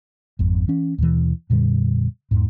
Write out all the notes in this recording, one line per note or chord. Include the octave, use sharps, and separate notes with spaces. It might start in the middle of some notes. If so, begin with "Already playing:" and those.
G#1 F2
E3 C#4
D#2 B2 E3
F2 A#2 D3 G3
E2 G#2